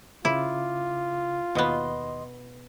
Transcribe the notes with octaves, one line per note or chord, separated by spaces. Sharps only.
C#3 E4 F4 D6
D#2 B2 B3 D#5 C6